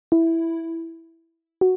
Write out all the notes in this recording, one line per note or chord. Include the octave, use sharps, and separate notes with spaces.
E4
F#4